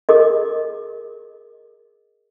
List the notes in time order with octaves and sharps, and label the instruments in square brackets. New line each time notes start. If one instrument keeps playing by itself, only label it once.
[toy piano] G#4 A#4 D#5